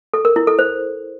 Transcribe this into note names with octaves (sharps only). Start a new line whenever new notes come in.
A4
A#4
E4
A4
C5